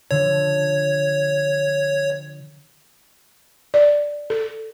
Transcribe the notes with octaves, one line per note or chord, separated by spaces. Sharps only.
D3 F3 C#5
D5
A4